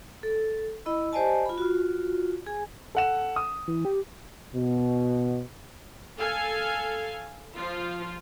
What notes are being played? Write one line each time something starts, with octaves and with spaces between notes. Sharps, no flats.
A4
E4 D#5 B5 E6
G4 C5 D5 D#5 G#5 A5
F4 B5
F4 F#4
G#4 G#5
A4 F#5 E7
D#6
E3
G4
B2
A4 F5 G#5
F3 F4